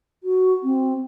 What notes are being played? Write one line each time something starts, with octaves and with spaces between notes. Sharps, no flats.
F#4
C4